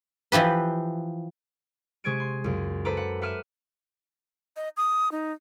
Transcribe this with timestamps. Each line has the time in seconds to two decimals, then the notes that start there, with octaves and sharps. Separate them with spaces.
0.32 E3 F3 G4 B4
2.04 C3 G#3 C#6 G#6 D7 D#7
2.20 C6
2.44 C#2 F#2
2.85 A4 B4 C5 A#5 D6
2.97 F#5
3.21 E5 F#5 D6 F6 D#7 E7
4.56 D#5
4.77 D#6
5.11 D#4